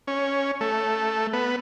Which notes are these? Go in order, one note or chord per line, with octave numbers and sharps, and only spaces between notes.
C#4
A3
B3